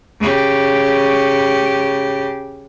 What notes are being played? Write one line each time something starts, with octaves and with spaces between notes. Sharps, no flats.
C#3 G4